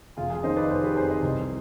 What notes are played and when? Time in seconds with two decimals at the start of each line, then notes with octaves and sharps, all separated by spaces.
0.17 F1 F4 G#4
0.30 F4 G#4
0.43 D#3 C5 D#5
0.57 B4 D5
0.70 F1 G#4 C5
0.83 G4 B4
0.96 F2 G#4 C5
1.10 C5 D#5
1.22 C2